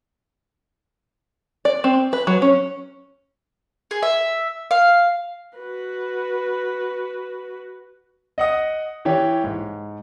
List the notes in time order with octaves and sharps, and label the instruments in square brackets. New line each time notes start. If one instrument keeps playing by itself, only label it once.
[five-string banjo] D5
C4
B4
F#3
C#4
[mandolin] G#4
E5
F5
[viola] F#4 B4
[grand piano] D#5 F#5 D#6
E3 G4 C#5
G#2